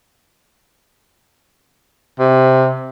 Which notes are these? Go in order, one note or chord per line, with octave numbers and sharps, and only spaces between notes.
C3